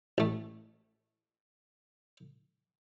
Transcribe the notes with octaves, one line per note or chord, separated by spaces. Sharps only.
A1 A3